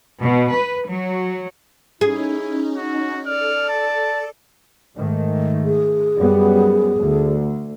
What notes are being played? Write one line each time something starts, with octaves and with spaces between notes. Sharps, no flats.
B2
B4
F#3
C#4 D#4 E4 G#4
F#4
A4 D5 F6
A5
G#2 D#3 A3
G#4
F#2 G3 B3
D2